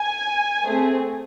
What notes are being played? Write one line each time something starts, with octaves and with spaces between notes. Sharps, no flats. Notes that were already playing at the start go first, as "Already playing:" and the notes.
Already playing: G#5
A3 C4 G#4